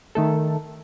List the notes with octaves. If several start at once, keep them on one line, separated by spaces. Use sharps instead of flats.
D#3 A3 A4